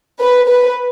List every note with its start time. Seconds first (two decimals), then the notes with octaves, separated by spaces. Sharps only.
0.20 B4
0.48 B4